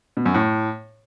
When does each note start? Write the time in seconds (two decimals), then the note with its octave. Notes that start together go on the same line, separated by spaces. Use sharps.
0.17 B2
0.26 F#2
0.34 A2